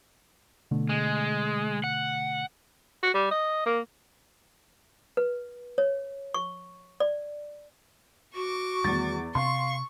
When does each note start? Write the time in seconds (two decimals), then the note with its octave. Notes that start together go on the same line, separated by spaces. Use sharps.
0.71 B2 D3 A3
0.89 G#3
1.84 F#5
3.03 F#4
3.14 G3
3.31 D#5
3.66 A#3
5.17 B4
5.78 C#5
6.34 C#6
7.00 D5
8.35 F#4 C#6 D6
8.84 E2 D#3 G3 A3 A6
9.35 C3 C4 F5 C6 C#6